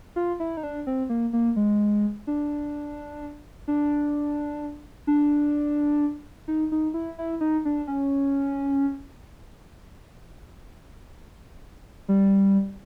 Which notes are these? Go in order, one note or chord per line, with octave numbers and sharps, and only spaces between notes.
F4
E4
D#4
D4
C4
A#3
A#3
G#3
D4
D4
D4
D#4
D#4
E4
E4
D#4
D4
C#4
G3